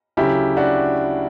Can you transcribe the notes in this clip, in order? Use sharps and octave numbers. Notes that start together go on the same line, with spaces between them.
D2 C#3 F#3 E4 G4
D4 F#4